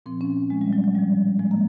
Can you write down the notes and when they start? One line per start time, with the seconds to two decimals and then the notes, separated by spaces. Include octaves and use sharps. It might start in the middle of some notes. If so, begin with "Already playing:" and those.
0.06 A#2 F3 C4
0.21 C#4
0.50 A#2 F3 G#3
0.61 G3
0.73 F#3
0.84 F#3
0.95 A2 F3 G3
1.39 A2 F3 G#3
1.51 A#3